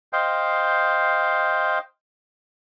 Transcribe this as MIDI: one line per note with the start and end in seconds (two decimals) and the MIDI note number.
0.13 1.79 72
0.13 1.79 75
0.13 1.79 77
0.13 1.79 79